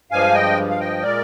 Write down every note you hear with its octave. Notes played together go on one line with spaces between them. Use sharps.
G2 F3 G#3 F5 G#5
D#5 G5
F5
D#5 G5
A#2 G#3 A#4 D5